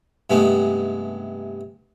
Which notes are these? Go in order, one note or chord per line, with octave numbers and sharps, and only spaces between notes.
G2 C3 G#3 A3 B3 D#4